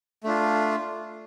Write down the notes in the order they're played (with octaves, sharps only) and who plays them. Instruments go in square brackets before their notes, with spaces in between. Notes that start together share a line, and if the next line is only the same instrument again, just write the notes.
[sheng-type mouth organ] A3 D4 F4